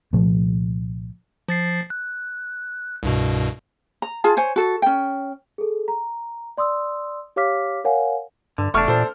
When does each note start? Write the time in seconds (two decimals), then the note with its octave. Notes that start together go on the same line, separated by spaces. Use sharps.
0.13 C2 A#2 F3 A3
1.49 F3 A6 C7
1.90 F#6
3.03 C2 G2 B2
4.02 A#5
4.24 F4 G#4 A5
4.37 C5 C#5 G#5
4.56 F#4 A4
4.82 C#4 G5
5.58 G#4 A4
5.88 A#5
6.57 D5 C6 D#6 E6
7.36 G4 C#5 F5 D6 F6 B6
7.84 A#4 C#5 F5 F#5 G#5
8.58 G2 D3
8.74 F1 E2 A2 A3 D4 C#6 F6
8.88 A#2 A4 C5